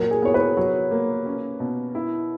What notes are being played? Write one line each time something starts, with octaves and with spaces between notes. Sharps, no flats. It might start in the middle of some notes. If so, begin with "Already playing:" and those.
Already playing: A#2 F#3 A#4
G#4
B3 C#5
B4
F#3 C#5
A#3
C#4
B2
E4